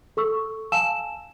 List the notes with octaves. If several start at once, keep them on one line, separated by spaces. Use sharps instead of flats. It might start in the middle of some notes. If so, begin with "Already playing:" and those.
A4 C#6 E6
F5 G#5 A5 E6 E7